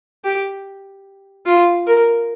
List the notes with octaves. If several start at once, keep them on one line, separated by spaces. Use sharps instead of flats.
G4
F4
A#4